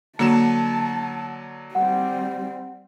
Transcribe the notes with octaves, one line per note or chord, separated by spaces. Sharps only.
D3 F#3 A#3 A5 E7
G3 C4 F#5